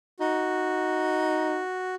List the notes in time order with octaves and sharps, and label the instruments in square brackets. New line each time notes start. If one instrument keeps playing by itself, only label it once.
[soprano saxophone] D#4 [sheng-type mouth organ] F#4